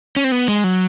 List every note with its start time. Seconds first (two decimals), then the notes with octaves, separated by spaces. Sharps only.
0.16 C#4
0.24 C4
0.32 B3
0.48 G#3
0.64 F#3